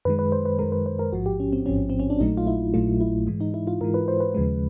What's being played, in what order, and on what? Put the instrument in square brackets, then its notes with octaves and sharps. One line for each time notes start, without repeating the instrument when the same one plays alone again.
[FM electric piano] F#2 D#3 G#3 B4
B4
C5
B4
F#2 D#3 G#3 A#4
B4
C5
A#4
A1 G#2 F3 F#4
G4
C#4
C4
A1 G#2 F3 C#4
C4
C#4
D4
A#1 A#2 F#3 A3 D#4
F4
E4
A#1 A#2 F#3 A3 F4
E4
G#2 E3 G#3
D#4
E4
F4
G#2 E3 G#3 A#4
B4
C5
B4
D#2 C#3 F3 G#3